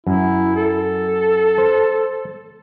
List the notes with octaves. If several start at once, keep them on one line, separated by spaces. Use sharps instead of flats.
F#2 E4
A4
C5